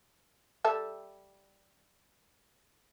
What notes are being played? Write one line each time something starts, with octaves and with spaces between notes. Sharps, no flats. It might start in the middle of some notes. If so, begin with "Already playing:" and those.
G3 A4 E5